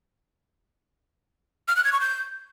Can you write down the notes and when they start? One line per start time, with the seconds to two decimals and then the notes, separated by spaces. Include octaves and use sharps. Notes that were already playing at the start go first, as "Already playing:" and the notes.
1.68 F6
1.76 F#6
1.84 G#6
1.92 C#6
2.01 G6